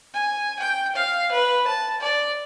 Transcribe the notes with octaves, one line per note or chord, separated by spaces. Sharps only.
G#5
G5
F5
B4
A5
D5